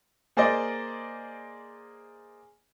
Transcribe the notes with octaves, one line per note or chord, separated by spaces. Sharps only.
A#3 G#4 C5 D5 D#5